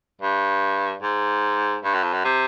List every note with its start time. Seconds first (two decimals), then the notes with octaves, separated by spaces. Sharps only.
0.21 G2
1.02 G#2
1.84 G2
1.94 F#2
2.03 F2
2.13 F#2
2.24 C3